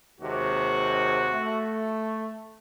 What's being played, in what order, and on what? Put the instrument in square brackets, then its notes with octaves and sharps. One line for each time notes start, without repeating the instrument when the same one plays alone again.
[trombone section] D#2 C3 G#3 [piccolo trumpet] F#4
[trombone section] A3